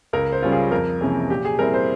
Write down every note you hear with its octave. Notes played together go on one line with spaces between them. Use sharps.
C#2 A#4
C5
C#3 G3 C#4 F4
G#4
F2 A#4
C3 E3 A#3 C#4 G#4
A#2 G4
G#4
G3 C4 E4 A#4
C5